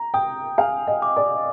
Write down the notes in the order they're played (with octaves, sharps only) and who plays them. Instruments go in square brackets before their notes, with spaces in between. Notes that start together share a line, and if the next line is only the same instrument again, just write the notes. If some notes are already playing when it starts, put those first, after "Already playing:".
Already playing: [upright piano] A#5
[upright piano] G5 [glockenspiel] D#6
[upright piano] F5 [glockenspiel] G#5
[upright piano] D#5
[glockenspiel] D6
[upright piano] D5